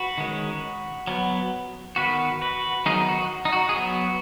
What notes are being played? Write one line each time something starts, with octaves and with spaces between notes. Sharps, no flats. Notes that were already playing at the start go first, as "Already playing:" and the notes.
Already playing: F#4 B4
D#3 G#3 C#4
F#3 B3
D#3 B3 F#4 B4
F#4 B4
D#3 F#3 B3 D#4 G#4
F#4
D#4
F#4
G#4
F#3 B3 F#4